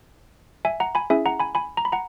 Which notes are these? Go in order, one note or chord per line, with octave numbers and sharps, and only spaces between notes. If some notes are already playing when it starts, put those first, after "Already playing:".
E5 G#5
F#5 A#5
G#5 B5
C#4 E4 G#4 E5 G#5
F#5 A#5
G#5 B5
G#5 B5
A#5
B5
F#5 A#5